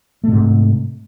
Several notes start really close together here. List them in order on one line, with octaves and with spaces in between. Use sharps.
A3 C3 G#2